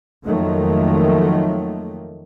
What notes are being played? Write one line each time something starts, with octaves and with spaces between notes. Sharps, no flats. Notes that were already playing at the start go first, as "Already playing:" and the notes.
F2 D#3 F#3 A3 A#3